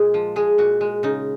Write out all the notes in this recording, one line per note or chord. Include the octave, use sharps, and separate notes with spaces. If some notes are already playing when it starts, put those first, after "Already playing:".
Already playing: A#2 G#3 G#4
F3
G#3 G#4
A#2 F#4
G#3
C#3 D#4